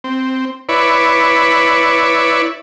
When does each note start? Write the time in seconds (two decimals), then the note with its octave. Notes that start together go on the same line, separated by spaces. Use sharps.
0.04 C4
0.69 E4 B4 C#5 D5